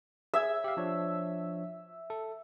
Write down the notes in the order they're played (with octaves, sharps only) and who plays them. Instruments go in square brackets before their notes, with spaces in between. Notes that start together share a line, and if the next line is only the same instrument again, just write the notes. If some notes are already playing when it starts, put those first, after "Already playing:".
[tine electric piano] G#4 G#6 [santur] E5
[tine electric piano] G4 F5
F3 D4 C#5
A4